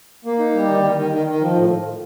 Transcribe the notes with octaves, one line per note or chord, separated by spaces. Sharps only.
A#3
D#4
G3
D#3
D#3
D#3
D#3
D#3
F3
A2